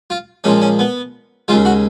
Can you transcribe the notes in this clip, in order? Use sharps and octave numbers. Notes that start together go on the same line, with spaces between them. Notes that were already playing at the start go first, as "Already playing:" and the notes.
F4
A#2 F3 G#3 C#4
C#4
B3
D#2 C#3 G#3 F4
F#4